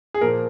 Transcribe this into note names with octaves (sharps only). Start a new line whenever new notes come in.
G#4
A#2 F3 A#3 A#4